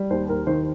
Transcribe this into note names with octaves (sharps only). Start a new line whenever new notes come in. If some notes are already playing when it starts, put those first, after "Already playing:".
Already playing: G3
D#2 C5
D#2 A#4
D#3 C5